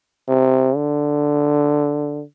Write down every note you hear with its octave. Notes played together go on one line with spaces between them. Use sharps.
C3
D3